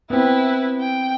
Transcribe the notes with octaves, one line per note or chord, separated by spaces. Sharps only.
B3 C4 E4 B4
G5